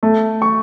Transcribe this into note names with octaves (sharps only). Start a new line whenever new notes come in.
A3
C#6